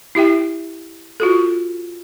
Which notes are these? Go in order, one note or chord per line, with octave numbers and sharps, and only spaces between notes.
E4 G4 E5 G5
F4 F#4 A4